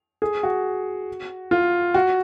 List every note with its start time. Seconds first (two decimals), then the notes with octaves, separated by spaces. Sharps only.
0.22 G#4
0.43 F#4
1.51 F4
1.94 F#4